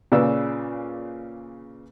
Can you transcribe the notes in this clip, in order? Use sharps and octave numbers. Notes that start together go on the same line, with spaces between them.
A#2 C#3 G#4 B4 D5 E6